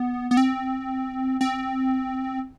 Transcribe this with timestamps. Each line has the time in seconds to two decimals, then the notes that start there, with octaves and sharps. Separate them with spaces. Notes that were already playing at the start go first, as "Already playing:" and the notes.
Already playing: B3
0.31 B3
0.37 C4
1.41 C4